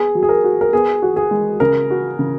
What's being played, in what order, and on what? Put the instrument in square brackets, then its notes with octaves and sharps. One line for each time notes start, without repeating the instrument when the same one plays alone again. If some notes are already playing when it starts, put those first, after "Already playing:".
Already playing: [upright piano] B3 [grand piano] G#4
[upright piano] F#3
[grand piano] G#4
A#4
[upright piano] F#4
[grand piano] A#4
[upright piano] B3 [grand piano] G#4
[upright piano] F#4
[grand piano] G#4
[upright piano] G#3
[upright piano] C#3 [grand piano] A#4
[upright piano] F#4
C#3